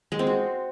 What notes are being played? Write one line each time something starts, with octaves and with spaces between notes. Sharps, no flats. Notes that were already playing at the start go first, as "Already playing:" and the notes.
G#3
C4
F#4